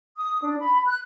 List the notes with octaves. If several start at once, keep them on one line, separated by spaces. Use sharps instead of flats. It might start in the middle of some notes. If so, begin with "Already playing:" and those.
D#6
D4
B5
F#6